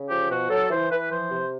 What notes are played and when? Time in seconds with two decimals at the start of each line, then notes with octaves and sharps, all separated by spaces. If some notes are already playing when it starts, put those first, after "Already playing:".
Already playing: C#3
0.09 F3 G4
0.30 B2 F#4
0.50 F#3 A4
0.70 E3 C5
0.90 E3 B4
1.11 F3 C5
1.30 C3